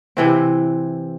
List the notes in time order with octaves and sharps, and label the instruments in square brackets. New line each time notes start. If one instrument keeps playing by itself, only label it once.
[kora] C3 E3 C4